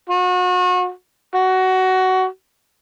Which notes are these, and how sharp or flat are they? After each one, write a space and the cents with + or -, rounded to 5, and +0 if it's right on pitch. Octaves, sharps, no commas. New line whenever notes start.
F#4 -35
F#4 +15